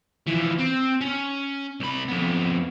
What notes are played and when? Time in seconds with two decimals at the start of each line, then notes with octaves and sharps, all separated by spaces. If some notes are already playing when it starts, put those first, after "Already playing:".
0.27 E3 F3
0.59 C4
1.01 C#4
1.80 C2 B5
2.08 F2 B3